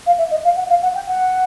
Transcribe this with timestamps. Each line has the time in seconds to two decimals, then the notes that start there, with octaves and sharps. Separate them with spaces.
0.06 F5
0.18 E5
0.31 D#5
0.44 F5
0.56 F#5
0.69 F5
0.82 F#5
0.95 G5
1.07 F#5